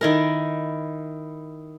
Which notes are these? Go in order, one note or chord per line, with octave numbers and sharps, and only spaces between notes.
D#3 E4 A#4